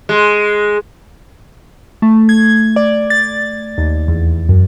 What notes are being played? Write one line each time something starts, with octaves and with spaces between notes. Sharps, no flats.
G#3
A3
G#6
D5
A6
D#2
E2
F#2